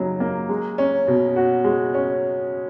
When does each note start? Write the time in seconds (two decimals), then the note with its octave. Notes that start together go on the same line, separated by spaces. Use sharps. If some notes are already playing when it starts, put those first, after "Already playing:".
Already playing: C#3 F#3 A#3 D#4
0.20 A#3
0.49 G#3
0.78 C#4
1.08 B2
1.36 F#4
1.64 G#3
1.94 C#4